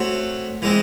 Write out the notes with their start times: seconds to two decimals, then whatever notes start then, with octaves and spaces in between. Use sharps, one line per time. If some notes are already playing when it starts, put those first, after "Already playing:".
Already playing: A3 C4 F#4 C#5
0.62 E3 G#3 C4